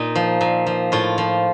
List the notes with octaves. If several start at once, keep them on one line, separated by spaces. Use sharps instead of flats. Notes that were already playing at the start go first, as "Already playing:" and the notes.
Already playing: A#2 D#4
F3
A#2
F3
A2 F4
F3